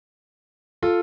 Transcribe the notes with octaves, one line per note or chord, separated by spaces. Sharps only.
F4 A4